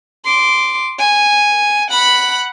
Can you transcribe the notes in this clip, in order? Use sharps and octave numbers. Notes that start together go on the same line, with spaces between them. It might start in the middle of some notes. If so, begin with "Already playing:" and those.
C6 D6
G#5
F#5 B5